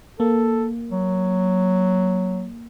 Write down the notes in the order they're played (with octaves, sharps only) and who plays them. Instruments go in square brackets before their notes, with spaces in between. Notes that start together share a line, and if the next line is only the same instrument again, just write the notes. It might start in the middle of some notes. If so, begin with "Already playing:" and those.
[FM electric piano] A#3 [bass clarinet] A4
[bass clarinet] F#3